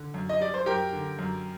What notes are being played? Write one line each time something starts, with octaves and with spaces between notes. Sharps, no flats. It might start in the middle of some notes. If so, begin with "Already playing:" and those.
Already playing: D3
F#2
D#5
G3 D5
C5
F#2 G4 A#4
D3
F#2